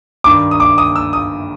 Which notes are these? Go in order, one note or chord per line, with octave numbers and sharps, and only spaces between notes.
G2 D#3 D6
D#6
D6
D#6
E6
D#6